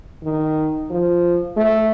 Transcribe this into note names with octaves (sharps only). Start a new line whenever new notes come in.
D#3
F3
A3